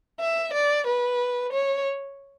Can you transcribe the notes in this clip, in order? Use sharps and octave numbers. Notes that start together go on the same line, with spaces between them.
E5
D5
B4
C#5